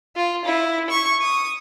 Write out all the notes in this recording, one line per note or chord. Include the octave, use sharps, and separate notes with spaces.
F4
E4
C#6
D#6